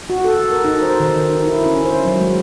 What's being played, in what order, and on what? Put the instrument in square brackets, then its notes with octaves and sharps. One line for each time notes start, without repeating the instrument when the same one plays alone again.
[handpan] F#4
A4
A#4
D#4
C5
D#3
D#4
E4
C#4
C5
F#3
G#3